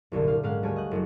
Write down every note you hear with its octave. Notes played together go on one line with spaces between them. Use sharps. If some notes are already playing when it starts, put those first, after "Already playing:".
F#1 C2 A#2 D3
A#2 F5
G#2 G#3 C#4 F5 F#5
D2 G3 A3 C#5 G#5 C#7
D#5 F#6
F#1 F#3